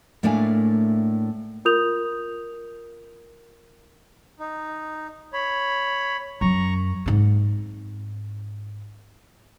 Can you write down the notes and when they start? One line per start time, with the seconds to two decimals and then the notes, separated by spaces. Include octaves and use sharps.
0.23 A2 A3 A#3 D4 F5 G#5
1.65 F4 A#4 D#6 G6 F7
4.39 D#4
5.33 C#5 B5
6.41 F#2 A#5 C#6
7.06 G#2 C4